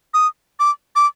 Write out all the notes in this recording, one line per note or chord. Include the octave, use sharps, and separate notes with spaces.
D#6
D6
D6